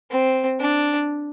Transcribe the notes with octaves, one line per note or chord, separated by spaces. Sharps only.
C4
D4